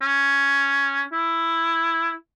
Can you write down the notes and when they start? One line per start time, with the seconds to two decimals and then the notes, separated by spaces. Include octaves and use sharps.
0.01 C#4
1.12 E4